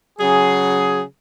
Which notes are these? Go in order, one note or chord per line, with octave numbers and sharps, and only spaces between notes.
C#3 F#3 G#4